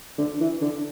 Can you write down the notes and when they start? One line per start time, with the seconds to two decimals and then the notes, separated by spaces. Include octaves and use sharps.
0.18 D3
0.41 E3
0.62 D3